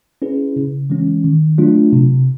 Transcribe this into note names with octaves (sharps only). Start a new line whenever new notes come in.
C#4 E4 G#4 B4
C#3
E3 G#3 C#4
D#3
F#3 A3 D4 F4
C3